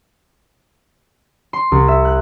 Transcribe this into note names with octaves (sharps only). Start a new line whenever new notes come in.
C6
C2
E5
F#6